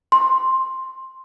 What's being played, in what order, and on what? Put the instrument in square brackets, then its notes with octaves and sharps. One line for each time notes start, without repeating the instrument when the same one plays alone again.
[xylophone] C6